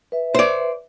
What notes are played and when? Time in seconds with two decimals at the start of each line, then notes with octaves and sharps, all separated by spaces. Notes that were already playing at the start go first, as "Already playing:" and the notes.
0.12 B4 E5
0.35 C5 D5